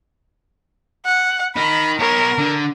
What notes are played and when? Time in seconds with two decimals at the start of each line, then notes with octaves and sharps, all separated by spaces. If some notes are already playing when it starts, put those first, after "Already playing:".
1.06 F#5
1.56 D#4 A#4 B5
1.99 B3 A#4 C#5
2.38 D3